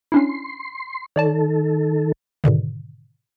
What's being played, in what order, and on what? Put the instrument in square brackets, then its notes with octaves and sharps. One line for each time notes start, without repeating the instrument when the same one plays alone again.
[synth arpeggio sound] C#4 D4 E4 [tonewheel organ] C6
[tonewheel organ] D#3 A4 [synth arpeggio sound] C#5 D5 A5
[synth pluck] G#2 B2 D3 D#3